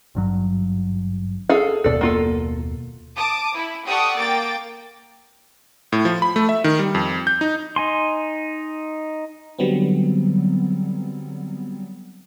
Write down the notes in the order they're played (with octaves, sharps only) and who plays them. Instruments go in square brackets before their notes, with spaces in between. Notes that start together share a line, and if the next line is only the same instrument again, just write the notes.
[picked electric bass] G#1 G2 F#3
[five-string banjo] G#4 A4 F5
[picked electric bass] F#1 D#2 B2 [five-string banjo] A4 D5
[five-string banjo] A#3 F4 A4
[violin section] A5 D6 D#6
E4
G4 A4 D5 F#5 C#6 D#6
A#3 G5 D6 A6
[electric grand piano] A2
F3
B5
A3
E5
D#3
G3
F2
G6
D#4
[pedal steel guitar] D#4 G#5 C6
[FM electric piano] D3 F#3 G3 B3 C4